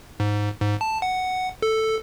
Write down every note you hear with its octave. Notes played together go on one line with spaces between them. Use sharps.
G#2
G#2
A5
F#5
A4